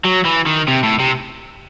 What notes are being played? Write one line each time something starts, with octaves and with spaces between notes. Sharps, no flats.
F#3
E3
D#3
C3
A2
C3